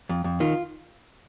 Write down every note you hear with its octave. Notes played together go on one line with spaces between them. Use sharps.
F2
F2
D#3 F4